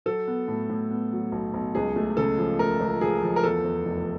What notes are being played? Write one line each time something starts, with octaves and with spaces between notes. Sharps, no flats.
F#3 A4
B3
A2
A2
B3
F#3
B1
B1
C#2 G#4
A3
C#3 A4
F3
A3 A#4
C#2
F3 G#4
F3
A#4
E2 A4
E2
F1